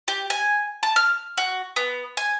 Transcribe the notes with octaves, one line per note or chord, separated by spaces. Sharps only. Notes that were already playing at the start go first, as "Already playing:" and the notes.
G4
G#5
A5
F6
F#4
B3
G#5